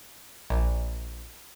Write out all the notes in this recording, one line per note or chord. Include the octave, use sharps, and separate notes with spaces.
A#1